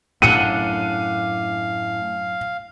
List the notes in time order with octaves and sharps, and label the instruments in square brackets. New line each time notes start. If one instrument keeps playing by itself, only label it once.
[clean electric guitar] F#2 D4 F#5 [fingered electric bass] A2 [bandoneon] F5 [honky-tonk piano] D#7